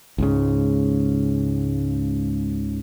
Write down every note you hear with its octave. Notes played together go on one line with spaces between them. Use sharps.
C#2 G#2 C#3